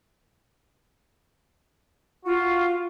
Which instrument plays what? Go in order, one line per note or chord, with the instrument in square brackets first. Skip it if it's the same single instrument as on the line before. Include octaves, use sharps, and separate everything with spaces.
[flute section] F4 [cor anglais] F#4